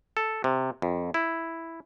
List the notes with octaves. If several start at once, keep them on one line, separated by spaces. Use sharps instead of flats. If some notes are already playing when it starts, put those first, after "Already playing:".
A4
C3
F2
E4